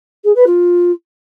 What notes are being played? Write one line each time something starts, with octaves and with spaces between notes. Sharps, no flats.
G#4
B4
F4